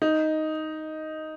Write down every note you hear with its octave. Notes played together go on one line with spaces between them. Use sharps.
D#4